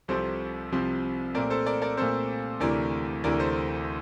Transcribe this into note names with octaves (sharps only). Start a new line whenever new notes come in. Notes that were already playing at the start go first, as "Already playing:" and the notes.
C2 C3 F3 C4 A4 C5
C2 C3 F3 C4
A#2 A3 C4 A#4 D5
A4 C5
A#4 D5
A#4 D5
A#2 A3 C4 A4 C5
D2 C3 E3 A3 A#4 D5
D2 C3 E3 A3 A#4 D5
A4 C5